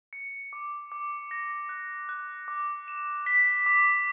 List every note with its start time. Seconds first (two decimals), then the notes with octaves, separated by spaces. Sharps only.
0.13 C#7
0.53 D6
0.92 D6
1.31 A#6
1.69 F#6
2.09 F#6
2.48 D6
2.88 E7
3.26 B6
3.66 D6